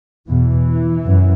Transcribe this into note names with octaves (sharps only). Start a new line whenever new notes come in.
E2 B2 E3
F#2